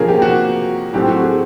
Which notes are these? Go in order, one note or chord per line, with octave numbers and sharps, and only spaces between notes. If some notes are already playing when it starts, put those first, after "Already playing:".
Already playing: C3 F3 A#3 C#4 G#4
G4
F#4
A2 F#3 A3 C4 G4
F#4
G#4